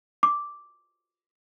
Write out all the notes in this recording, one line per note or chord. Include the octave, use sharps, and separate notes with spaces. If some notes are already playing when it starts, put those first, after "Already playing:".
D6